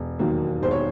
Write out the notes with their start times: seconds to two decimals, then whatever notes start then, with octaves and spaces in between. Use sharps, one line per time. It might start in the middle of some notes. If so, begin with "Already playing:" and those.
Already playing: E1
0.19 D#2 D#3 F#3 A#3
0.62 E1 C5
0.71 C#5